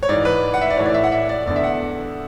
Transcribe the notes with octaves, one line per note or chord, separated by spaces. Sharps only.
C#5
G#2 E3 D5
B4
F#5
E5
D5
A2 E3 C#5
D5
E5
F#5
E5
D5
E2 D3 D5
E5
F#5